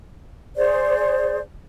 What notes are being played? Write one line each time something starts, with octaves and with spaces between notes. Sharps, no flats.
G#4 C5 D5